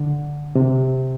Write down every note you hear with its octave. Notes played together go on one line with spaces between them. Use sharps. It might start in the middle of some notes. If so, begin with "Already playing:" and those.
Already playing: D3
C3